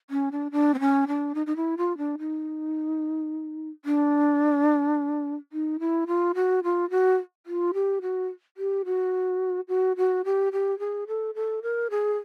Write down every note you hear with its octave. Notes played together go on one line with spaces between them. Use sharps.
C#4
D4
D4
C4
C#4
D4
D#4
D#4
E4
F4
D4
D#4
D4
D#4
E4
F4
F#4
F4
F#4
F4
G4
F#4
G4
F#4
F#4
F#4
G4
G4
G#4
A4
A4
A#4
G#4